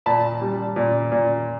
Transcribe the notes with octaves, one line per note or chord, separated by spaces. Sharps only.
A#2 A5 B5
G3
A#2
A#2